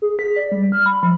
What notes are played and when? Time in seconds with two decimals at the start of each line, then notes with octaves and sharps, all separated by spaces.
0.02 G#4
0.19 B6
0.36 D5
0.52 G3
0.72 F6
0.86 B5
1.03 F3